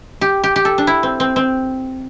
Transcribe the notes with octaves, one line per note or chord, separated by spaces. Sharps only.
G4
G4
G4
A4
D4
E4
C4
C4
C4